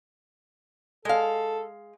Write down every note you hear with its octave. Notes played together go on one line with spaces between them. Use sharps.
G#3 A4 F5